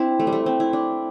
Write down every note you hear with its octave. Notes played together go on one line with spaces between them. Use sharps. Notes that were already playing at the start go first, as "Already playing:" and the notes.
Already playing: C4 D4 E4
A3
G3
A3
C4
E4
D4